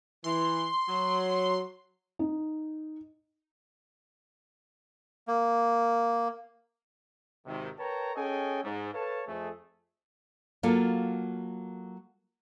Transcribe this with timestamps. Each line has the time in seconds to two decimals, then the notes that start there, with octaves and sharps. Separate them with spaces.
0.24 E3 C6
0.88 F#3
2.19 D#4
5.28 A#3
7.46 G#1 C3 D#3
7.78 A#4 B4 C#5 G5 A5 A#5
8.16 C#4 G#4 A4 D#5 G5 G#5
8.64 G#2
8.93 A4 B4 C#5 F5 A5
9.28 F2 A3 G#4
10.63 F#3 A#3 F4 A4